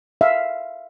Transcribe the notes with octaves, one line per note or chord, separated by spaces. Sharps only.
E5 F5